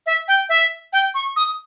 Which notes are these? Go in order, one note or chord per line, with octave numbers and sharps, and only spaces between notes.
E5
G5
E5
G5
C#6
D#6